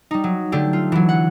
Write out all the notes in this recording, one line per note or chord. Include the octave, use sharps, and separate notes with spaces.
G3 D#4
F#3
D3 A3 D4 G4
F4
E3 F#3
F#5